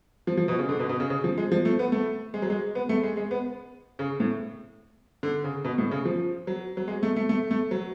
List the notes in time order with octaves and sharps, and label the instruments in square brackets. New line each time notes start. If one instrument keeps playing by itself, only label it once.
[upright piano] F3
F3
B2
C#3
D3
B2
B2
C#3
C#3
F3
G#3
F3
A3
B3
A3
G#3
F#3
G#3
B3
A3
G#3
G#3
B3
C#3
A2
D3
C#3
B2
A2
C#3
F3
F#3
F#3
G#3
A3
A3
A3
A3
F#3